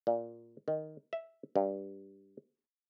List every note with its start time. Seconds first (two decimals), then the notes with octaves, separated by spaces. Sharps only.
0.07 A#2
0.68 D#3
1.13 E5
1.56 G2